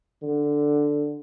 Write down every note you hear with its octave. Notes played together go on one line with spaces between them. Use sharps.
D3